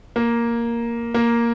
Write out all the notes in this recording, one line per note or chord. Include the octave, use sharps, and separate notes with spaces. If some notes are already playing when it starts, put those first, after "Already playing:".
A#3
A#3